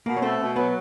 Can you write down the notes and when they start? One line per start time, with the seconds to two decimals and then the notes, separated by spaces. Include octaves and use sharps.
0.06 B2 A#3 A#4
0.17 C#5
0.22 A3 C4 C5
0.40 B2
0.56 F#3 B3 B4